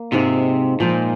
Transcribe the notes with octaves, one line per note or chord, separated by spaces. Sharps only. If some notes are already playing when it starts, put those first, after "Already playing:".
Already playing: A#3
G#2 C3 G#3 F4
A#2 F3 G#3 D#4 C5